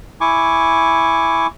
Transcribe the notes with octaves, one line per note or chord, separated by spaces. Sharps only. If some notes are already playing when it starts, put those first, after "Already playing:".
E4 G#5 C#6 D6